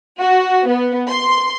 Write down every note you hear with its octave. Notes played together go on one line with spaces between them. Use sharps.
F#4
B3
C6